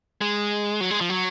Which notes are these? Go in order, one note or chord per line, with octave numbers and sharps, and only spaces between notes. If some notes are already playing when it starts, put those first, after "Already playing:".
G#3
F#3
G#3
F3
F#3